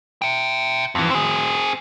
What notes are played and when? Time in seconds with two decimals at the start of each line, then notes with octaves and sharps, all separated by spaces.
0.22 E5 G5
0.95 F2 E3
1.10 C4 G#4